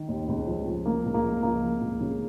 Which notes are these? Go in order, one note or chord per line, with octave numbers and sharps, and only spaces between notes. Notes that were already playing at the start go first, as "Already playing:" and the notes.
Already playing: D#3
D#2
C#2
F3
C#2
C#3 A#3
C#2
A#3
F3
C#2 A#3
F3
C#2
C#3